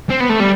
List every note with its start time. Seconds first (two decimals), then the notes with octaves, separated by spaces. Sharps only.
0.10 C4
0.20 B3
0.29 A3
0.40 G3